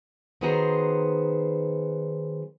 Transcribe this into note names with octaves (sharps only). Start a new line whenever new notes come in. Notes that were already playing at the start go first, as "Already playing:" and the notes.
D#3 F#3 B3 G#4 C5 A#5